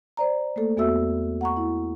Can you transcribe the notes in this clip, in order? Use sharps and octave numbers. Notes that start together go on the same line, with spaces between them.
C5 D5 A#5
A3 A#3 A4
E2 B3 F#4 A4 E5 E6
F#5 A#5 C#6
E4